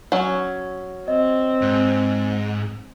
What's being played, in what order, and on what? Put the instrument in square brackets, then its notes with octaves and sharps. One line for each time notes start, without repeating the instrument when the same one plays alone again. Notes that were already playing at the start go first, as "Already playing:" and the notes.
[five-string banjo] F#3 C#4
[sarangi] C4 [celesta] D#5
[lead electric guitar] G#2